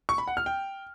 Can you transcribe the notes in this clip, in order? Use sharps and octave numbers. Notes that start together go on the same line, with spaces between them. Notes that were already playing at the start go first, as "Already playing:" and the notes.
C#6
B5
F#5
F6
G5